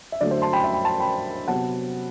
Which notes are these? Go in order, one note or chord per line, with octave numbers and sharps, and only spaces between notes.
E5
D3 F#3 A3 D5
C5 E5
A5 C6
G5 B5
E5 G5
G5 B5
A5 C6
G5 B5
C3 F#3 B3 F#5 A5